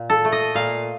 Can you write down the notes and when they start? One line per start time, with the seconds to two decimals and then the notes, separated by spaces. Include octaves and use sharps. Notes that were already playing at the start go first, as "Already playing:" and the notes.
Already playing: A#2
0.10 A4
0.25 A3
0.32 D#5
0.55 A#2 F5